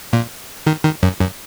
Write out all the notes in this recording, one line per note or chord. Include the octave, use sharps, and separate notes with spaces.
A#2
D#3
D#3
F#2
F#2